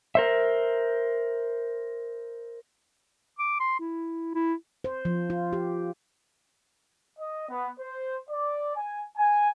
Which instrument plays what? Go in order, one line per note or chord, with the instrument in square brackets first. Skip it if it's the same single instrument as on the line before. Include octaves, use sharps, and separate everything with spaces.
[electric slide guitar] A#4 C5 E5
[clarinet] D6
C6
E4
E4
[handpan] C5
F3
F4
G4
[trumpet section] D#5
B3
C5
D5
G#5
G#5